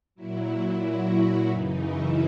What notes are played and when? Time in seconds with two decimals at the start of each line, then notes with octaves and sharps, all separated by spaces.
0.15 A#2 F#3 E4
0.48 E4
0.81 F#4
1.15 E4
1.47 F#2 C#3 E3 D#4
1.80 E4